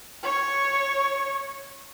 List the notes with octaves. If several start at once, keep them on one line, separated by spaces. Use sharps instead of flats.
C#5 C#6